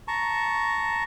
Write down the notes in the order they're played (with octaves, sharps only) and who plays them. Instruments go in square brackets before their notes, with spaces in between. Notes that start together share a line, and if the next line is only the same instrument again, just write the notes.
[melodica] A5 A#5 C#6